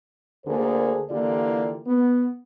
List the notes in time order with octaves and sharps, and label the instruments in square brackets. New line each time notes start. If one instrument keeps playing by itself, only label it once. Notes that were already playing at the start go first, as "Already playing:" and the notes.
[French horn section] D2 D3 A#3 G#4 A#4 C5
D3 E3 A#3 F4 G4 D5
B3